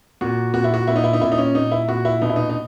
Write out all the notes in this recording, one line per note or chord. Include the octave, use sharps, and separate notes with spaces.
A#2 F#4
A#2 F#4
E4
F#4
A#2 E4
D#4
E4
D#4
A#2 E4
D#4
C#4
A#2 D#4
E4
A#2 F#4
E4
B2 D#4
E4
D#4
D#4